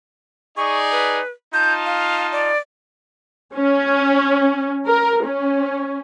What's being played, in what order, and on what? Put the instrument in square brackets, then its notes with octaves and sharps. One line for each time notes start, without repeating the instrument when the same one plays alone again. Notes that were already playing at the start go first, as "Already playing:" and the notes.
[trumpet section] D#4 G#4 D5 [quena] C#6
[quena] B4
[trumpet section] D#4 F4 A5 [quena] G6
[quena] F5
D5
[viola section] C#4
A#4
C#4